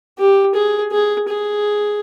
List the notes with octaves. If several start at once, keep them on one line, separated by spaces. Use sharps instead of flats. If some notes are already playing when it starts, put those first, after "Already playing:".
G4
G#4
G#4
G#4